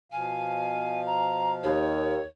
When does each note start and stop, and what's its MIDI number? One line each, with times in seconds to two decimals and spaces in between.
0.12 1.71 47
0.12 1.71 53
0.12 1.71 77
0.12 1.00 80
1.06 1.53 82
1.64 2.17 39
1.64 2.26 73